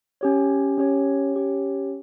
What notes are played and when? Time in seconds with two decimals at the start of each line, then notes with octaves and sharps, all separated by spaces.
0.21 C#4 G4 C#5
0.78 C#4 G4 C#5
1.35 C#4 G4 C#5